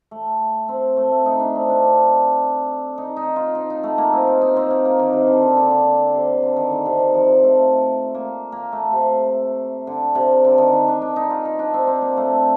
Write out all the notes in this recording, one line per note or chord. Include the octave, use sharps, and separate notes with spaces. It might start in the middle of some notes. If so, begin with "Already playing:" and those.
A3
C4
A3
A3
D#4
D4
C4
D4
D#4
D#4
F4
D#4
D#4
A3
A#3
C4
D#4
D#4
C4
A#3
A#3
D#3
C3
D3
D3
D3
D3
C3
D3
D#3
D3
C3
D#3
F3
F3
A3
A#3
A#3
A3
C3
D3
C3
D3
D#3
D4
D4
D4
D#4
F4
D#4
D4
C4
C4
A#3
A3